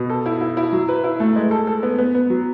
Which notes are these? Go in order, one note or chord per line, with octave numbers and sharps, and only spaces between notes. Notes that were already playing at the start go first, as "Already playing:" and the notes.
Already playing: B2
A4
E4
E4
E4
F#3
B4
E4
A3
G#3
A4
A4
B3
B3
B3
F#3